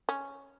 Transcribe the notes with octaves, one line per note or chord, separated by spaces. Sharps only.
C#4